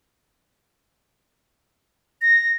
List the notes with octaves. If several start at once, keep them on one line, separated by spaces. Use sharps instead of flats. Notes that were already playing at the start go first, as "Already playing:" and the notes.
A#6